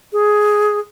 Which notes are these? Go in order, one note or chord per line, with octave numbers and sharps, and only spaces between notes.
G#4